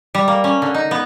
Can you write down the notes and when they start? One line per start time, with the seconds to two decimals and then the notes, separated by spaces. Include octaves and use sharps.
0.14 G3
0.28 A#3
0.44 C#4
0.62 D3
0.74 D#4
0.91 B3